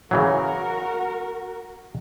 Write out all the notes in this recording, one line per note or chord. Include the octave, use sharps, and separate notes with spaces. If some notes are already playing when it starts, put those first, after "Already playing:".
C#3 E3 F#3 F#4 A#4